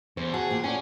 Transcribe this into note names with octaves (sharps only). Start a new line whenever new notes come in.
E2 C5
F#4 G#4 F#5 A5
A#2 G4
C#4 D5 G#5